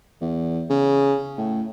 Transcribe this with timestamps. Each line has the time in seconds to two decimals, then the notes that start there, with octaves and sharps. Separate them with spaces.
0.21 E2
0.70 C#3
1.38 A2